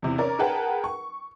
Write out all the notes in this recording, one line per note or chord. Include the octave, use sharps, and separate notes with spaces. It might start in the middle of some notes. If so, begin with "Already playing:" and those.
E2 C3 E3
C#4 A#4 D5
G#4 A#4 B4 F#5 G5 A5
C#6